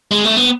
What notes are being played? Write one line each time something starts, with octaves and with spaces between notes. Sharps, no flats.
G#3
A3
B3